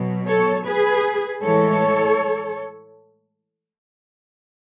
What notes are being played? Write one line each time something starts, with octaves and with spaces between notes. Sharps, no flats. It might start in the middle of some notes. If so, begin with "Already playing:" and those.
Already playing: B2 F#3
A4 C#5
G#4 B4
A2 E3 G#3 A4 C#5